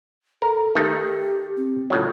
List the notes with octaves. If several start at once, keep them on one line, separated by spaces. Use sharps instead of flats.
A4 A#4
D#3 A3 G4 A4
C4
A2 C#3 F#3 F4